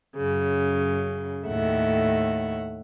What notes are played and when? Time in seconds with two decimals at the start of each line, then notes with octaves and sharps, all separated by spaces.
0.17 F#2 C#3
1.47 D#2 A2 A4 E5 F#5